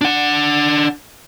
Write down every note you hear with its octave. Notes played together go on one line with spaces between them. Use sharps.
D4 F#5